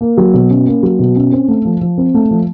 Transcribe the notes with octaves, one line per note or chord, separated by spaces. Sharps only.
A#3
F#3
B2
C#4
A#3
F#3
B2
C#4
C4
A3
F3
F3
C4
A3
F3